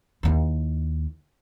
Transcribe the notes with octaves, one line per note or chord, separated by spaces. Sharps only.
D#2 E4